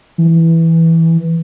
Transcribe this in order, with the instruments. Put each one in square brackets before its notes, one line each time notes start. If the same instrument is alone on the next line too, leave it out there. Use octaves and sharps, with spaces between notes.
[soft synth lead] E3